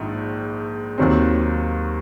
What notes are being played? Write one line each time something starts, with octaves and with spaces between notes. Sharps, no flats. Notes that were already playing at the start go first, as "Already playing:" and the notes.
Already playing: A#1 G#2 D#3
D#2 D#3 F#3 C4